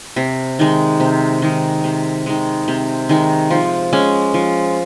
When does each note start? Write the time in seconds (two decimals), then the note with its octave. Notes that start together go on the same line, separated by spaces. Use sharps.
0.16 C3
0.59 D#3 G#3
1.00 C3
1.42 D#3 G#3
1.84 C3
2.26 D#3 G#3
2.68 C3
3.09 D#3 G#3
3.50 F3
3.93 G#3 C#4
4.34 F3